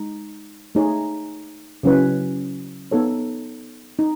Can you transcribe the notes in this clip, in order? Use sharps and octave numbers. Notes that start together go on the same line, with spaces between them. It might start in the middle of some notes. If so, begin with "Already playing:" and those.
Already playing: G#3 D#4
A3 D#4 G#4 C#5
C#3 F#3 C#4 E4 B4
B3 D#4 A4 C#5
D#4